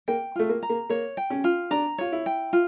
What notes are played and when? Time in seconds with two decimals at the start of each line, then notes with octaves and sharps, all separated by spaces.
0.08 A#3 G5
0.36 A3 F4
0.49 A#3
0.63 A#5
0.70 A#3
0.90 A#3 C#5
1.17 G5
1.30 C#4
1.44 F4
1.71 D4 A#5
1.98 F4 C#5
2.12 E4
2.26 G5
2.53 F4